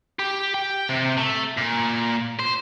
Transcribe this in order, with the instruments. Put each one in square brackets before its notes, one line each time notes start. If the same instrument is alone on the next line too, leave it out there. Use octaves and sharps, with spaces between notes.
[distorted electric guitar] G4
G5
C3
A3
A#2
C5